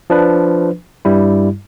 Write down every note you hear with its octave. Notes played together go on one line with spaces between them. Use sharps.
F3 D4 B4
G2 G3 E4